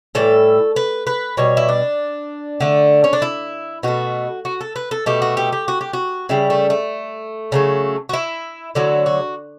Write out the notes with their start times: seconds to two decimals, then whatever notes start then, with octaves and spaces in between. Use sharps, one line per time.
0.15 A2 E3 G3 A4
0.76 B4
1.07 B4
1.37 B2 G3 C#5
1.57 E4
1.69 D4
2.61 D3 A3
3.04 C#4
3.13 D4
3.22 E4
3.83 B2 A3 F#4
4.45 F#4
4.61 A4
4.76 B4
4.91 A4
5.06 B2 A3 G4
5.22 F#4
5.37 G4
5.52 G4
5.68 F#4
5.81 G4
5.93 F#4
6.29 C#3 G3 E4
6.50 A3
6.70 A3
7.52 C#3 F#3 A3
8.09 F#4
8.13 E4
8.75 D3 F#3 A3 E4
9.06 F#4